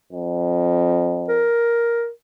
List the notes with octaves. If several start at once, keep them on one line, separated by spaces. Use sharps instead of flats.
F2
A#4